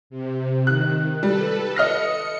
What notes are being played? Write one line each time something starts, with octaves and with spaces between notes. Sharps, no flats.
C3
D#3 F#6
G3 A4 B4
D#5 F6 A#6 C#7